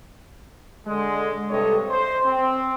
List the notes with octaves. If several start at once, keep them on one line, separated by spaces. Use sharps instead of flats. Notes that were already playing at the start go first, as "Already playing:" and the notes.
D3 G#3
G2 C3 A4 C#5 D#5
C5
C4